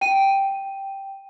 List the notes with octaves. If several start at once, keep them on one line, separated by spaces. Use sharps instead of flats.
G5 D#7